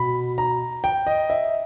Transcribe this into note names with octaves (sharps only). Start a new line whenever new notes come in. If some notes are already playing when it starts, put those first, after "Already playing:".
Already playing: B2 B5
A#5
G5
D#5
E5